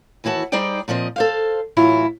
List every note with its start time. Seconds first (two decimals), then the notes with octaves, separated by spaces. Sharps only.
0.24 D#2 E3 E4 F#4 A5
0.52 G3 D#4 G#4 C5 D5 G5
0.88 A#2 F3 C4 D#5
1.16 A4 C5 F5
1.77 A2 E3 F#3 E4 F4